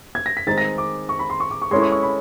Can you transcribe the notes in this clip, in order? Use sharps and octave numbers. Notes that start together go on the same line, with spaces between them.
G#6
A#6
B6
D#3 G#3 C4 D#4 A6
A#6
D6
C#6
B5
C6
C#6
D6
C#6
G#3 C#4 E4 A4 C6
C#6
C#6
B5